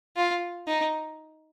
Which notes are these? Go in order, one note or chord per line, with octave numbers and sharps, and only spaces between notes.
F4
D#4